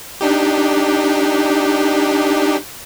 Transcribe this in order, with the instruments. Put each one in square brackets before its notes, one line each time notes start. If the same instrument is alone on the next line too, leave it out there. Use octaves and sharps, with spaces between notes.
[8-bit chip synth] D4 D#4 G4